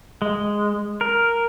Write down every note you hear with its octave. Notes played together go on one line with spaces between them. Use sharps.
G#3
A#4